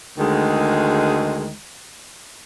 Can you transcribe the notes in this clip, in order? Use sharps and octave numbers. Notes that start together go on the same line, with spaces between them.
D2 D#3 G#3